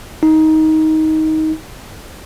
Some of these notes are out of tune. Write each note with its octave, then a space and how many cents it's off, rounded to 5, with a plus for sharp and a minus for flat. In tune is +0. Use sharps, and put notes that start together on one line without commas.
D#4 +15